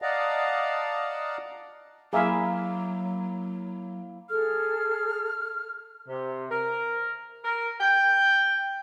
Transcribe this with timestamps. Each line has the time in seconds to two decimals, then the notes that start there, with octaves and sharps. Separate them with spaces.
0.02 D5 D#5 F5 F#5 A5 A#5
2.13 F#3 A#3 E4 G#4 E5 F5
4.29 G#4 A4 F6
6.09 C3
6.51 A#4
7.45 A#4
7.81 G5